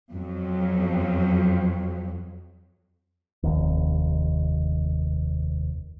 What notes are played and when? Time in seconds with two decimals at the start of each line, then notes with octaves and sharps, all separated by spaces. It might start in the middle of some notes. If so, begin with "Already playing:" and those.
0.12 F2 F#3
3.43 F1 D#2